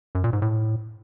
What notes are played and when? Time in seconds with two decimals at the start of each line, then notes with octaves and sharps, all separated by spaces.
0.15 F#2
0.24 A#2
0.33 G#2
0.42 A2